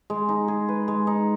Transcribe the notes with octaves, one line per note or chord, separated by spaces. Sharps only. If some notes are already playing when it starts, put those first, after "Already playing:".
G#3
D#4
G#4
B4
G#3
D#4